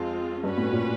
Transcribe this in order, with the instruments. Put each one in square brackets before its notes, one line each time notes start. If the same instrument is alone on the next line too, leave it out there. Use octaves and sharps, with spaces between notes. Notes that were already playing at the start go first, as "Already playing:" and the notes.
Already playing: [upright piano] F2 [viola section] G#3 C4 F4
[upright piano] G2 [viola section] C#4 F#4 B4
[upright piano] A2
A#2